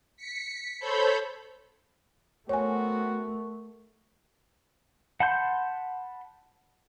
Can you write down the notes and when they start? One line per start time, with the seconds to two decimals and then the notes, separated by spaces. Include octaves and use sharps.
0.17 B6 C#7
0.80 A4 C5 C#5 B5 G6
2.49 A3 B3 C4 F#4 A#4 C#5 G#5 C#6
5.20 F#5 A5 B5 C6 G6